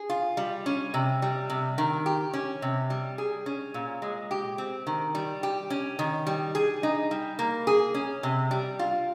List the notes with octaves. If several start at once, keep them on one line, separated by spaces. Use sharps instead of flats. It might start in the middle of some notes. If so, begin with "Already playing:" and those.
Already playing: G#4
F4
G3
C#4
C3
G3
C3
D#3
G4
C#4
C3
G3
G#4
C#4
A#2
G#3
G4
C4
D#3
G3
G4
C#4
D#3
G3
G#4
D#4
G3
A#3
G#4
C#4
C3
G3
F4